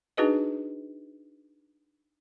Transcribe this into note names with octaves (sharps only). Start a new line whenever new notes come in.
D4 D#4 F#4 G#4 B4 D#5